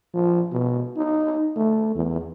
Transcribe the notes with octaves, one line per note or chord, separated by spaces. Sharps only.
F3
B2
D#4
A3
E2